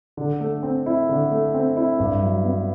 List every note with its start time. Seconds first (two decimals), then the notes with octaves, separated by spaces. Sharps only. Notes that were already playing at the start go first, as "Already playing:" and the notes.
0.17 D3
0.40 A3
0.63 C4
0.86 E4
1.09 D3
1.31 A3
1.54 C4
1.77 E4
2.00 G2
2.22 F#3
2.44 B3